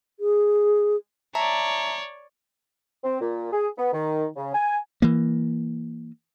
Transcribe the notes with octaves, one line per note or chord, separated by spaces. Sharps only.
G#4
C#5 D5 E5 A5 A#5
C4
A#2
G#4
B3
D#3
C#3
G#5
E3 A#3